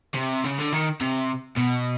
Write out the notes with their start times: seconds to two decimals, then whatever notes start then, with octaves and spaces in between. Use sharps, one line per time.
0.15 C3
0.44 C#3
0.58 D3
0.73 D#3
1.01 C3
1.56 B2